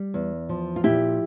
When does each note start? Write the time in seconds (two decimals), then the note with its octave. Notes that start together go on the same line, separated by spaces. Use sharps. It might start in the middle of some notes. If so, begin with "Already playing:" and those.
Already playing: G3
0.14 E2
0.49 F3
0.76 F4
0.83 A#2 E4 G4